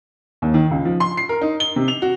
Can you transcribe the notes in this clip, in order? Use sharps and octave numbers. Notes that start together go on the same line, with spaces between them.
D#2
D#3
C#2
F3
C6
C7
A#4
D#4
G7
C3
F7
F#4